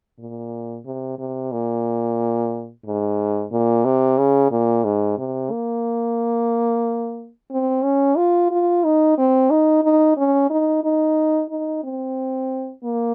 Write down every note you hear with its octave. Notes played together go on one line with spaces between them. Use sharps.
A#2
C3
C3
A#2
G#2
A#2
C3
C#3
A#2
G#2
C3
A#3
C4
C#4
F4
F4
D#4
C4
D#4
D#4
C#4
D#4
D#4
D#4
C4
A#3